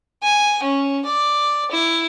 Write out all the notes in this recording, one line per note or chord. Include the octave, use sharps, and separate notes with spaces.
G#5
C#4
D5
E4